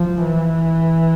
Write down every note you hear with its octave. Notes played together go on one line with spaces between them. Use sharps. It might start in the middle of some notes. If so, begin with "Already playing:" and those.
Already playing: F3
E3